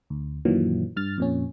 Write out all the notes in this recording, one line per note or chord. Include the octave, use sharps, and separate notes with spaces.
D2
F#2 A#2 D#3 E3 F#3
G2 F6 A6
F2 A#2 C#4